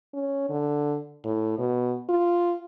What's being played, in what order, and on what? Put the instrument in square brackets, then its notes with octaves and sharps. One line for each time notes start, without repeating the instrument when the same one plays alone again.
[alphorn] C#4
D3
A2
B2
F4